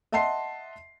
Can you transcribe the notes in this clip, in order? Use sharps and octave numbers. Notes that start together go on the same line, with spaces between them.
D#5 E5 F#5 A5 C6 C7